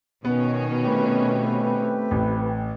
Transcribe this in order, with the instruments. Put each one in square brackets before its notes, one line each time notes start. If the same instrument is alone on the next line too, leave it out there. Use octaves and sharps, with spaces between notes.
[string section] B2 D#3 C#4 [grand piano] B3
[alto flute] A3 [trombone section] C4 G4 B4
[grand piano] A1